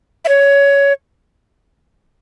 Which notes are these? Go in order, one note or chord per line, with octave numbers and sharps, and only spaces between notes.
E5
C#5